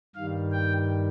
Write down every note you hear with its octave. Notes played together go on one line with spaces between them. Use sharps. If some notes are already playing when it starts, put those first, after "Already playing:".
G2 D#3 G3 F5
G5